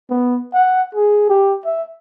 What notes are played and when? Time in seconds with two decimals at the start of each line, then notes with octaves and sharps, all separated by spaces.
0.10 B3
0.54 F#5
0.95 G#4
1.30 G4
1.65 E5